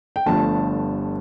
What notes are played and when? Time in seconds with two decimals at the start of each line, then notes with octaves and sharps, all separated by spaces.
0.16 G5
0.26 G1 G2 F3 A3 A5